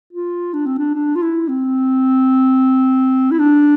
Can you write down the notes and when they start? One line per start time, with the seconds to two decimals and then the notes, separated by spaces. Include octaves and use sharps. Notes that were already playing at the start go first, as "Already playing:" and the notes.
0.13 F4
0.53 D4
0.66 C4
0.78 D4
0.95 D4
1.15 F4
1.22 E4
1.48 C4
3.31 E4
3.39 D4